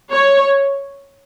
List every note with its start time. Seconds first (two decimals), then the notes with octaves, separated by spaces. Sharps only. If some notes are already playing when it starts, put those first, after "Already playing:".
0.12 C#5